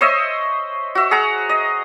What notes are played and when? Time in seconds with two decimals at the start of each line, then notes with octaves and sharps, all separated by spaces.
0.01 C5 C#5 D#5 E5
0.95 F#4 E5
1.11 G#4 F#5 A#5
1.49 D#5